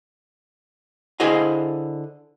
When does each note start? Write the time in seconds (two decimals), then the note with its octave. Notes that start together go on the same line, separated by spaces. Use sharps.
1.20 D3 E4 G#4 C5 D#5 F5